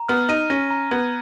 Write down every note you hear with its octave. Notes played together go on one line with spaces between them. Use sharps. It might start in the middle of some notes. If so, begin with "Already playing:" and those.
Already playing: A#5
B3 F6
D#4 D#7
C#4 A#6
A#5
B3 G#6